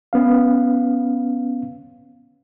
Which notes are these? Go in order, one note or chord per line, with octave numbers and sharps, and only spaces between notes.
B3 C#4 F5